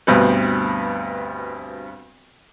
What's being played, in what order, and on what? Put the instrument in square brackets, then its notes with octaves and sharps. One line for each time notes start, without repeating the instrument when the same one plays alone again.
[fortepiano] D2 G2 B2 C4 B4